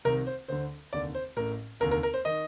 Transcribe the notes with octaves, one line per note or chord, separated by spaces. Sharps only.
C2 C3 D#3 A#4
C5
D2 D3 C5
F1 D#2 D3 D5
C5
A1 A2 A#4
F1 D#2 D3 A#4
A#4
A#4
C5
D#3 D#5